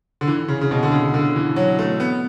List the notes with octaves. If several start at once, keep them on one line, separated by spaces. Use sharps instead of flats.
D3
E3
C#3
C#3
B2
D3
C#3
D3
E3
F#3
A3
B3